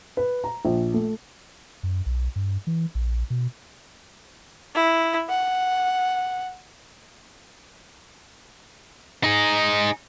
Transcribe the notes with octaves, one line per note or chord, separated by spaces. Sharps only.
B4
A#5
A#1
A3
F#2
B1
G2
E3
A#1
B2
E4
F#5
D#4 G#4